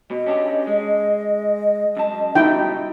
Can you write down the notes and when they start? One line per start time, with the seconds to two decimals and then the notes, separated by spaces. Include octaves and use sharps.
0.11 B2 D#5
0.26 C#4 D4 G4
0.67 G#3
1.97 F#2 A5
2.35 B2 G3 D#4 E4 G5